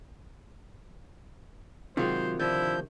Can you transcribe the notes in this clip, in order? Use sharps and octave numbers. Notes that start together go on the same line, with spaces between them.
C3 D#3 F#3 G#3 F4 C5
D3 F3 E4 G6